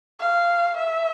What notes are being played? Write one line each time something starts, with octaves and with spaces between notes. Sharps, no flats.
F5
E5